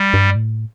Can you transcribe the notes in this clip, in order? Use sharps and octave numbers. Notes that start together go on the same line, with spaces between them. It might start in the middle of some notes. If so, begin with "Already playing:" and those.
Already playing: G3
G2
A2